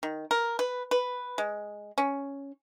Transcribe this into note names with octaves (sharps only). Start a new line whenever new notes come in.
D#3
A#4
B4
B4
G#3
C#4